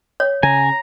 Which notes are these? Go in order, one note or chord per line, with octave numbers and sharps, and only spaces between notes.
C#5
C#3 G#5 A#5